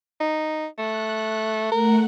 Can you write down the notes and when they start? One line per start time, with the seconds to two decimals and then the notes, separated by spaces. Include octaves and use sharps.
0.20 D#4
0.78 A3 F#6
1.72 A3 A#4 F#5